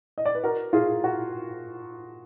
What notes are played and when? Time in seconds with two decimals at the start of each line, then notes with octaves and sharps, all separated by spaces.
0.18 D#5
0.25 D5
0.35 B4
0.43 F#4 A#4
0.73 F4 G#4
1.04 F#4